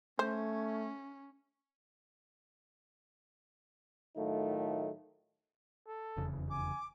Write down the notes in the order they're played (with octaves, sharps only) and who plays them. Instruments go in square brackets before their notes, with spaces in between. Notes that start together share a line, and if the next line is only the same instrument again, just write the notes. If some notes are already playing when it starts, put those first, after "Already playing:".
[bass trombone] A3 [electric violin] C#4 [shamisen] C5
[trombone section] A2 D#3 F#3 A3 D#4 F4
[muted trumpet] A4
[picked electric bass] F1 E2 C#3
[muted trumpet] G#5 [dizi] D6